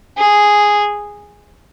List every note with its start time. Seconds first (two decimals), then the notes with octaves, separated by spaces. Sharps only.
0.17 G#4